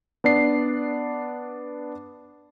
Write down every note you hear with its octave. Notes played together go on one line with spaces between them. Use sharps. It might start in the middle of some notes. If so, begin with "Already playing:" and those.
B3 D4 D5 C7